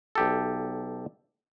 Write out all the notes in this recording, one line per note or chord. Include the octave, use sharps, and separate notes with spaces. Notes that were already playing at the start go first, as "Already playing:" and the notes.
B1 G4 A4